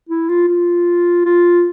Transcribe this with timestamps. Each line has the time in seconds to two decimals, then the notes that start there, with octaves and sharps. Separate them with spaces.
0.09 E4
0.29 F4
0.49 F4
1.25 F4